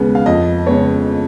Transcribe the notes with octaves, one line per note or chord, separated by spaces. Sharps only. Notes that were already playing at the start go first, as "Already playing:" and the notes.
Already playing: D#2 C#3 G#3 B3
F5
F2 D#5
C#3 G#3 B3 C#5